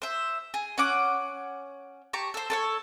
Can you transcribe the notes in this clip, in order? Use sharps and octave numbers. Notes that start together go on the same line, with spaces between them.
C5 E5
G#4
C#4 F#5 D6
G4 A5 A#5 C#6
A4 C5
A4 C5 C#5